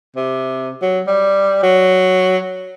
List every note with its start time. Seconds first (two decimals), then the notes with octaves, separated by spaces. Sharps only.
0.16 C3
0.82 F#3
1.07 G3
1.63 F#3